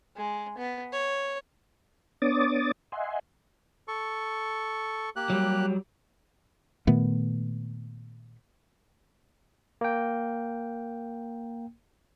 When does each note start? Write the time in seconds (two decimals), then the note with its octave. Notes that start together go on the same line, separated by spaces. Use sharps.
0.17 G#3
0.58 B3
0.93 C#5
2.22 B3 D4 C#5 D6 D#6 A6
2.92 D#5 E5 F#5 G#5 C6
3.88 A4 C#6
5.16 A#3 G4 F#6
5.30 F#3 G3
6.87 A#2 D#3 A3 B3
9.81 A#3 G5